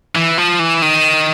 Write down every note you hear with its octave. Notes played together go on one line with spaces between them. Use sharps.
E3
F3
E3
D#3